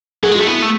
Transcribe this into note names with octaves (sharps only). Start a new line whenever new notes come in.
F#3 G#4
G#3
A3 F#4
B3 E4
A3